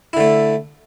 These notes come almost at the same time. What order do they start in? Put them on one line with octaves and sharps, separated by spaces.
E4 D3 A3